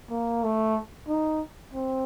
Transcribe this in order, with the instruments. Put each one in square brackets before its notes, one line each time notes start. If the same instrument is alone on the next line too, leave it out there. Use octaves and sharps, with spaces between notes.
[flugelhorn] A#3
A3
D#4
C4